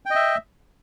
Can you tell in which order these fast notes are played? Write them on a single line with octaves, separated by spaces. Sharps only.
G5 D#5 E5